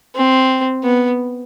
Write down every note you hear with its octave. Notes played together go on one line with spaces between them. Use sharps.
C4
B3